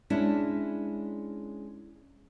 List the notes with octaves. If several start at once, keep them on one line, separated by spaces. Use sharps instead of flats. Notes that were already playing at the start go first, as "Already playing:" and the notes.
G#3 C#4 D4 E4